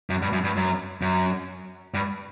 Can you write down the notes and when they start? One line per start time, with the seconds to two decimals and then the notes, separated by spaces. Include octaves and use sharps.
0.10 F#2
0.22 G2
0.32 F#2
0.44 G2
0.56 F#2
1.02 F#2
1.94 G2